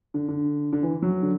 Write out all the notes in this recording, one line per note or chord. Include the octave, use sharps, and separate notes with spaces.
D3
D3
D3
E3
F#3
D3